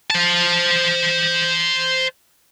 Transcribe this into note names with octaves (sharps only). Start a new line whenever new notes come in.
C5 A5